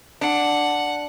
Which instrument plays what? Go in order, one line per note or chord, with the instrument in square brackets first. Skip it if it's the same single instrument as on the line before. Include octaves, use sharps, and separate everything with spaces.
[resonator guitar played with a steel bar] D4 [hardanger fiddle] F#5